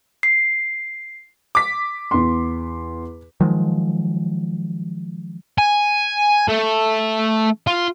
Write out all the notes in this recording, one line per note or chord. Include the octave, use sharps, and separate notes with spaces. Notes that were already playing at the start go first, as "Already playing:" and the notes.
C7
D6 B6
E2 C6
D#3 F3 F#3 G#3
G#5
A3
F4